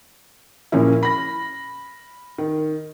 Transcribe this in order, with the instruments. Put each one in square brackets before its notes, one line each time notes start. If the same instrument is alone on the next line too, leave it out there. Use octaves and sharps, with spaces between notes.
[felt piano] A#2 C#3 F3 A#3 C#4 E4
B5 A#6
D#3